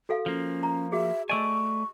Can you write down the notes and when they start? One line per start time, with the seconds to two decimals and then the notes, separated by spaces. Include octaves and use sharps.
0.09 F#4 A4 F5
0.26 F3 A#3 C#4
0.63 A#5
0.92 F#4 G#4 E5
1.29 A3 D5 D#5 G#5 C#6 E6